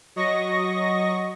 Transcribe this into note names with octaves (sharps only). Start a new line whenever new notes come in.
F#3 D#5 C#6 A#6